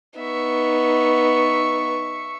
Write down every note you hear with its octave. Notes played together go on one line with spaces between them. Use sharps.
B3 D#4 E5 C#6